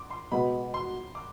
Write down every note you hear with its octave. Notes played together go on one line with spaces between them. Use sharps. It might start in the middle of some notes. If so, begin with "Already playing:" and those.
Already playing: C6 D6
C6
B2 G#3 B3 B5
C6
D6